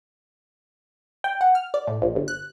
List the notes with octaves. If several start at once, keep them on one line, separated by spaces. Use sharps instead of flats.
G5
F#5
F6
D5
A2
A#1
G1
F#6